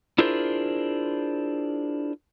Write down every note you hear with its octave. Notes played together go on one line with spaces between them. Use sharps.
D4 E4 F4 G#4 A#4 C5